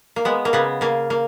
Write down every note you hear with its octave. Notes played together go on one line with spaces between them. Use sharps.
A#3
G#3 B3
A#3
C#3 B3
C#3 A#3
A#3